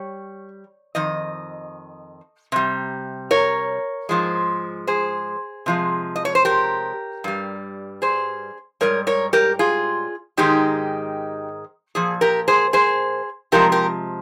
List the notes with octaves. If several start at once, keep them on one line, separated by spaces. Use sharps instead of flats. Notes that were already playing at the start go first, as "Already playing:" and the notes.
Already playing: G3 C#5
F2 D#3 D#5
C3 G3
A#4 C#5
G#2 F3 G#3
G#4 C5
C3 F3 G#3
D#5
C#5
C5
G4 A#4
G2 G3
G#4 C5
G#2 G3 A#4 C#5
A#4 C#5
G4 A#4
F4 G#4
G#2 D#3 G#3 D#4 G4
A#2 F3 G#4
G4 A#4
G#4 C5
G#4 C5
C3 F3 G#3 G4 A#4
G4 A#4